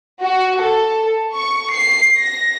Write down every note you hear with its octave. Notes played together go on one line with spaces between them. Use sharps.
F#4
A4
C#6
C7
A#6